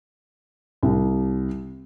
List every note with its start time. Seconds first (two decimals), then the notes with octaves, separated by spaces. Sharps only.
0.83 C2